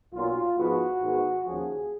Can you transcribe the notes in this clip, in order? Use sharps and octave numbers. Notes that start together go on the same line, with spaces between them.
B1 A#2 F#3 F4
G#2 F3 G#3 B3 F#4
G#2 D#3 G#3 B3
D#2 C#3 F3 G#4